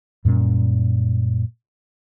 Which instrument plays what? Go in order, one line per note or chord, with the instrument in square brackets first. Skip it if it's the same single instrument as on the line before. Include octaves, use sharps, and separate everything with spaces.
[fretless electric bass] F#2 A#2 G3 C#4